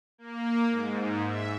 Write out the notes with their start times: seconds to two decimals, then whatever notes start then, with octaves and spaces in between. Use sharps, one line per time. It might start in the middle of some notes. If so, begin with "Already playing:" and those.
0.18 A#3
0.70 G#2
1.27 E5